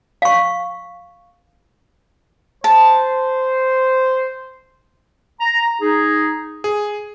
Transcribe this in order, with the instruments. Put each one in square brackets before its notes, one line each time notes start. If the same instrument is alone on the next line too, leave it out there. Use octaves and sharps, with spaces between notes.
[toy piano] F5 C#6
[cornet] C5 [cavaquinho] A5
[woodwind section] A#5
D#4 G#4
[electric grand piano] G#4